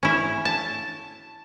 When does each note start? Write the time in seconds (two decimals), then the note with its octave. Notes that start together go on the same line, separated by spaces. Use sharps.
0.03 C#4 E4
0.45 A5